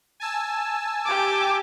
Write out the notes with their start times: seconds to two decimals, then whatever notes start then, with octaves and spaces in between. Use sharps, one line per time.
0.20 G#5 A5 E6
1.05 G4 D6